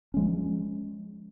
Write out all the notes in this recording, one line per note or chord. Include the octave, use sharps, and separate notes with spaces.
F3 G#3 C#4